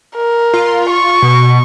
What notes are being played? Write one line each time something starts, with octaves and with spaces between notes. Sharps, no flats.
A#4
F4
C#6
B2